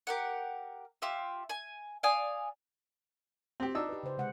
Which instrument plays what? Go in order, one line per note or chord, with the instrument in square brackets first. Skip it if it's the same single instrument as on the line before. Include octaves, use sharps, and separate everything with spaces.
[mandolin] G4 A#4 F#5
F4 G4 E5
G#5
D5 F5 G#5 D#6
[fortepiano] C4 G4
D4 D#4 E6
[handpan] G4 B4
C#3 C5
C3 G#3 F#5